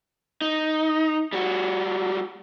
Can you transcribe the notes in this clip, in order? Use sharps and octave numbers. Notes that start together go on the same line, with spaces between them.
D#4
G3 F#4